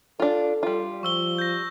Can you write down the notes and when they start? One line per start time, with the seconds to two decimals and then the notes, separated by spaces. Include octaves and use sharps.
0.20 D4 F4 A4
0.63 G3 F4
1.03 F3 C#6 E6 G7
1.38 G6 A#6